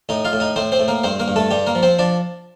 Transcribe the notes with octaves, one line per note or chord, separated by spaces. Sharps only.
A2 D#4 D#5
F4 F5
A2
D#4 D#5
A2 C4 C5
C4 C5
A2
A#3 A#4
G2 C4 C5
A#3 A#4
G2
A3 A4
G2 G3 G4
A#3 A#4
F3
C4 C5
F3 D4 D5